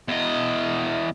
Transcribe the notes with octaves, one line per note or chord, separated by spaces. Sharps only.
E2 D#5